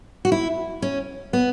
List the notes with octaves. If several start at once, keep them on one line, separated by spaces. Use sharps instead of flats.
F#4
E4
C#4
B3